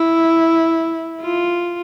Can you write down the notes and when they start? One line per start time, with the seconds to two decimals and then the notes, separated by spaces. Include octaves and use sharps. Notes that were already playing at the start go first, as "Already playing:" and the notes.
Already playing: E4
1.21 F4